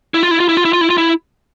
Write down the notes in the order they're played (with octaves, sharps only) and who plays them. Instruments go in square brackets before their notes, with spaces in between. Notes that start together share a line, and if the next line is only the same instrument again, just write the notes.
[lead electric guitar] E4
F4
E4
F4
E4
F4
E4
F4
E4
F4
E4